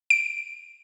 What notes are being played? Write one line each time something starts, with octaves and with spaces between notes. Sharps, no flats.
D7